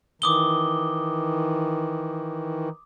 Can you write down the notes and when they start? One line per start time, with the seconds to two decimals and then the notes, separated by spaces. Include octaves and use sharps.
0.22 D#3 E3 D6 D#6 G7